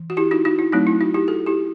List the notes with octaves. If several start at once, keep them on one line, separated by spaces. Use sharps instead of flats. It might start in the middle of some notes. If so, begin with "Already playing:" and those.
Already playing: E3
F#4
E4 G4
D#4 F#4
D#4 F#4
E4
F#3 A3 C4 D#4
E4
D#4 F#4
E4 G4
F#4 A4
E4 G4